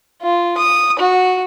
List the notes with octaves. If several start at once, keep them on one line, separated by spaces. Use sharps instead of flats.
F4
D#6
F#4